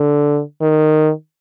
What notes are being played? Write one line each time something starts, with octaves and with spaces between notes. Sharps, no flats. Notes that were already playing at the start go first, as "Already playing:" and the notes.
Already playing: D3
D#3